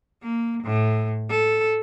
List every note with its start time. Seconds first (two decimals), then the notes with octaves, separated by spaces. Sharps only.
0.22 A#3
0.63 A2
1.29 A4